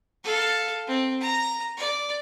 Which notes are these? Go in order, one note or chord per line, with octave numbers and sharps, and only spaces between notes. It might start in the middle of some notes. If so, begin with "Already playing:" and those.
A4 F5
C4
A#5
D5